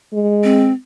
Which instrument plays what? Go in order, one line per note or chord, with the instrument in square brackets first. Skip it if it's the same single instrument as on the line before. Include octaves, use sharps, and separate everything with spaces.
[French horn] G#3
[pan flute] C4